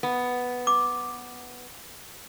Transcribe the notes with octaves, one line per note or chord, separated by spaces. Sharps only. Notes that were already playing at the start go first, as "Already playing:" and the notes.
B3
D6